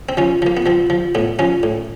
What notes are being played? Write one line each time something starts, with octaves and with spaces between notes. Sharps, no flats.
C4
F3 C#4
F3 A#3
B3
F3 C4
F3
A2 B3
F3 C#4
A2